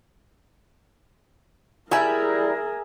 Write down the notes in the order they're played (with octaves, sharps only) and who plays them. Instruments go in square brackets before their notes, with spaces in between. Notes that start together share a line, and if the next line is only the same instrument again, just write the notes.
[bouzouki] G3 E4 [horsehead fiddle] G#4 A#4 [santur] E5 G#5 A#5